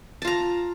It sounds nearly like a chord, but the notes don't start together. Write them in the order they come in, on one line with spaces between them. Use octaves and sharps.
A5 F4 A#5